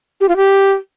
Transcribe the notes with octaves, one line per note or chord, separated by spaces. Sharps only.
G4
F4
G4